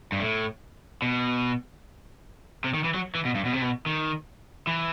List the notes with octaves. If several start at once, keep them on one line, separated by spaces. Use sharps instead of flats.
G2
A2
B2
C3
D#3
E3
F#3
E3
B2
G2
B2
C3
B2
D#3
E3